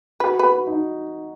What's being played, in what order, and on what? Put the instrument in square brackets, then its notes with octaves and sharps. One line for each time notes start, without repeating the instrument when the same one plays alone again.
[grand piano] F#4 [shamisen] B4
[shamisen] B4
[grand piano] F#4
D#4